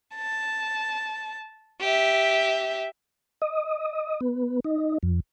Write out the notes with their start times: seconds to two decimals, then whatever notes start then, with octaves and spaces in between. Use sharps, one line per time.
0.16 A5
1.81 G4 E5
3.42 D#5
4.21 B3
4.64 D#4
5.03 F2